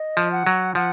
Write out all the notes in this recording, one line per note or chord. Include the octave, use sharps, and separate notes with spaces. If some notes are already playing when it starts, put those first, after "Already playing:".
Already playing: D#5
F3
F#5
F#3
F3 F#5